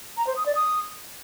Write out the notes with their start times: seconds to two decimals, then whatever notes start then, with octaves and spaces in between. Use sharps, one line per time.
0.17 A#5
0.27 C5
0.36 D#6
0.46 D5
0.55 D#6